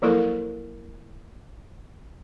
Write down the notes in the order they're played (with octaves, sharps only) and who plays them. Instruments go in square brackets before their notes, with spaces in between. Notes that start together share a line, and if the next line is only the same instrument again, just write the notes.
[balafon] F3 F#3 A#3 E4 A4 A#4